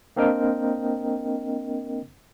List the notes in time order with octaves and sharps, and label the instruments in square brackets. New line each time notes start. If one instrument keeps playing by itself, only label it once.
[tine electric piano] A#3 C4 D4 A#4 D#5 G5